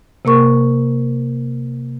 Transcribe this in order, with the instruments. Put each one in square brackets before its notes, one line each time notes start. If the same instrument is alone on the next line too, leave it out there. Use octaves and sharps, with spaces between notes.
[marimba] C3 A#3 A#4 C#6